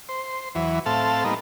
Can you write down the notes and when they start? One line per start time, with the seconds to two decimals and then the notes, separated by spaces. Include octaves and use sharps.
0.09 C5
0.55 E2 E3 F#3
0.86 A2 C4 A4 F5 A5
1.24 G3 A#3 B3 D#4